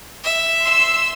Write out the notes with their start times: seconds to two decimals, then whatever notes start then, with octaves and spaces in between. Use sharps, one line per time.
0.24 E5
0.63 C6 E6